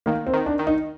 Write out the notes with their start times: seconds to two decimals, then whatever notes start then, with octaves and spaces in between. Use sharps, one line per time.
0.06 D#3 A#3
0.27 C4
0.33 D#3
0.46 D4
0.59 D#3
0.67 D#4